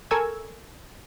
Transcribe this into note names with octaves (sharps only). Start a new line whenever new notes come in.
A4 A#4 G#5 C#6 E6 G#6